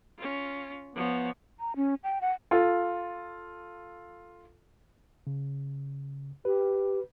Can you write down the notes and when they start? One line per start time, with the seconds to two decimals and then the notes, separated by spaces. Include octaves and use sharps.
0.18 C#4 F4
0.95 F3 B3 C#5
1.60 A#5
1.76 C#4
2.04 G5
2.21 F#5
2.51 F4 A4
5.27 C#3
6.45 G4 B4